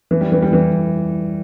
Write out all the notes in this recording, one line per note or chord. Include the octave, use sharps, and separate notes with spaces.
E3
G3
E3
G3
E3